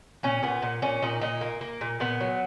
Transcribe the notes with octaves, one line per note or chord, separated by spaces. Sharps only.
A#2 C#4
A#2 B3
A#2
A#2 C#4
A#2 D#4
A#2 D#4
A#3
A#3
A#2
A#2 B3
F#3